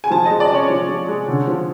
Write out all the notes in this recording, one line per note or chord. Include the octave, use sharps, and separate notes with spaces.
G#5
F3 A5
G#3 D#5
D5
C#4 C#5
F3
F3
G#3
D3
F3